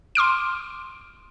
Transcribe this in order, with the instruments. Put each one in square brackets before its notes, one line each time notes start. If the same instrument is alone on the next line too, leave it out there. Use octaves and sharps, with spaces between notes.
[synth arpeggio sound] C6 D6 F6 D7